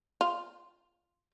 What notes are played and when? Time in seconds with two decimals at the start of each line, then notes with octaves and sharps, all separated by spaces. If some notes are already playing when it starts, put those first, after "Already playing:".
0.21 F4